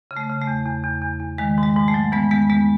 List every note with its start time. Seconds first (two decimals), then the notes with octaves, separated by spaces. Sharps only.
0.11 C#3
0.17 A3
0.29 C#3
0.41 A3
0.47 E2
0.66 E2
0.84 E2
1.02 E2
1.20 E2
1.38 D#3 G#3
1.58 G#2
1.63 G#3
1.76 G#2
1.88 A3
1.94 F#3
2.12 E3 G#3 B3
2.31 E2 G#3 B3
2.50 E2 G#3 B3